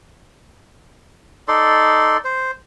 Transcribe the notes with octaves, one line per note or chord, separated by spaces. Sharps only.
D#4 A4 D5 C6
C5